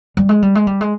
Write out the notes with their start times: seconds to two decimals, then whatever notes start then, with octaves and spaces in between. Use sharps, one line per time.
0.17 G3
0.29 G#3
0.42 G3
0.55 G#3
0.67 G3
0.81 G#3